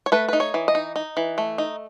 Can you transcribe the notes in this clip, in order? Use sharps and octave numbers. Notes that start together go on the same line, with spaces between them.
C#5
A3 B4
D#4 B4
C#5
E3
D#5
D#4
D#4
E3
A3
D#4